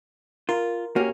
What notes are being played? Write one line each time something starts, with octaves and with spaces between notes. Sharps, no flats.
F4 A#4
A#3 C#4 F#4 G4